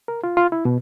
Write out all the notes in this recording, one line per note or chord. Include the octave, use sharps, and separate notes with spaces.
A#4
F4
F4
E4
B2